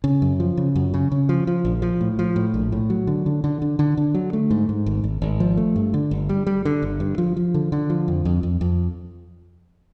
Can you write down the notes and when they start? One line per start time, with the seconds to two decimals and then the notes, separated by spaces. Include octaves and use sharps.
0.04 C#3
0.22 F#2
0.40 F3
0.57 C#3
0.76 F#2
0.94 C#3
1.12 C#3
1.29 F3
1.47 F3
1.65 A#1
1.82 F3
2.01 A2
2.19 F3
2.36 A2
2.54 A#1
2.72 A2
2.90 F#3
3.07 D3
3.26 D3
3.44 D3
3.62 D3
3.79 D3
3.97 D3
4.14 F#3
4.33 A3
4.50 G#2
4.69 G#2
4.86 G#1
5.04 G#1
5.22 G#1
5.40 F3
5.57 A3
5.76 G2
5.94 D3
6.11 G1
6.29 G3
6.47 G3
6.65 D3
6.82 G1
7.00 G2
7.18 F3
7.37 F3
7.54 D3
7.72 D3
7.90 F3
8.08 F2
8.25 F2
8.43 F2
8.61 F2